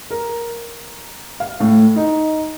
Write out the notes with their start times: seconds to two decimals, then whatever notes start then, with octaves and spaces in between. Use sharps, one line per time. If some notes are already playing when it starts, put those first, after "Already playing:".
0.11 A#4
1.40 F5
1.60 A2
1.96 D#4